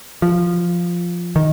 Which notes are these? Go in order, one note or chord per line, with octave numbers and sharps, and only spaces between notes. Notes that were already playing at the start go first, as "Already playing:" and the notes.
F3
D#3